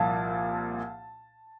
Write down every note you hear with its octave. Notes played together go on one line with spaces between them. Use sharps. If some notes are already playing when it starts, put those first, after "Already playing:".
Already playing: C2 A#2 F3 A5